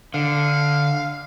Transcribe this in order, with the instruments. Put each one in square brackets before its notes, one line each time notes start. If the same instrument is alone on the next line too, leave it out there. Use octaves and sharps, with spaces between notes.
[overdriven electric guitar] D3 [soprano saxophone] F5